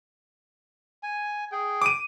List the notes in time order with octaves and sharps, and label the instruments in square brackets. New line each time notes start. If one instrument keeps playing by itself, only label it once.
[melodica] G#5
G#4 G5
[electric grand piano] D6 D#7